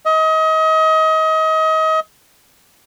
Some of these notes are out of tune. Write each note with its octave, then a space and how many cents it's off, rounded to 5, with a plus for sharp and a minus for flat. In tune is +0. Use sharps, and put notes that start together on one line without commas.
D#5 +30